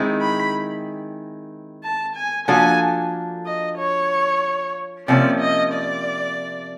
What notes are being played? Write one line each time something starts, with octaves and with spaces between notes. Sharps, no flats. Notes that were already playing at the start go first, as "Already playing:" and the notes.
Already playing: D#3 G#3 C4 E4
B5
A5
G#5
F3 A#3 D4 F#4 A4 G#5
D#5
C#5
C3 F3 A#3 C#4 D5
D#5
D5